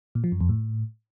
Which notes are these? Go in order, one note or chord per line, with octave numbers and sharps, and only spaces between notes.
A#2
F3
F#2
F2
A2